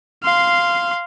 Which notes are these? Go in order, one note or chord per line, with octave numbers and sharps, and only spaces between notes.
F5 C6